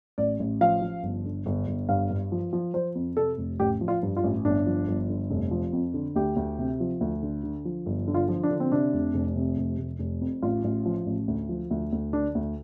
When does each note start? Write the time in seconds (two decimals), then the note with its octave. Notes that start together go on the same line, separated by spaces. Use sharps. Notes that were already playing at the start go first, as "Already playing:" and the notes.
0.18 A1 D5
0.40 A1
0.61 F3 F5
0.82 F3
1.03 G1
1.25 D3
1.46 G1
1.67 G1
1.89 G2 F5
2.10 G2
2.32 F3
2.53 F3
2.74 F3 C5
2.95 F2
3.17 C3 A4
3.38 F1
3.59 A1 G4
3.81 F3
3.88 F4
4.03 G2
4.16 F4
4.24 A1
4.45 G1 D4
4.66 F3
4.88 G1
5.09 D3
5.30 F1
5.51 F3
5.73 F2
5.94 D3
6.16 D2 G4
6.36 D2
6.59 C3
6.80 F3
7.01 D2
7.23 D3
7.44 D3
7.65 F3
7.86 G1
8.08 D3
8.14 F4
8.29 F3
8.43 D4
8.51 D3
8.60 C4
8.72 C3 D4
8.93 F1
9.14 F1
9.35 C3
9.57 F1
9.79 F1
9.99 F1
10.21 F2
10.42 A1 F4
10.64 A1
10.86 F3
11.06 A1
11.28 D2
11.49 F3
11.71 D2
11.92 D2
12.13 D3 D4
12.35 D2